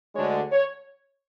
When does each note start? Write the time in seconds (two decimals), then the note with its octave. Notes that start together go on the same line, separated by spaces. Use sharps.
0.15 D2 D3 G#3 D4 C#5
0.52 C#5